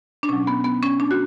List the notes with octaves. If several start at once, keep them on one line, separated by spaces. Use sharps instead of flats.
D4
B2 F#3 C#4
B3
B3
C#4
D4
F#4